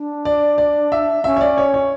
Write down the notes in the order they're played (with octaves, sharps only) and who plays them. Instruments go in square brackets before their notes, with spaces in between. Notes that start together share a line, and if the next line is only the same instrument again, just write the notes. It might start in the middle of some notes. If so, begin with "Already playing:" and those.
Already playing: [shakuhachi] D4
[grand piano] D5
D5
E5
[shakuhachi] C#4 [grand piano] E5
[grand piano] C#5
D5
C#5
C#5